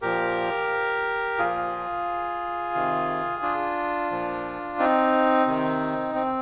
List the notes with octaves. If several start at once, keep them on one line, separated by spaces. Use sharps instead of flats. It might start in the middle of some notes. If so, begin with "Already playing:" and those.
A#2 F3 G4 A#4
A#2 F3 F4 G#4
C3 D#3
D4 F4
A#2 F3
C4 D#4
C3 D#3
C4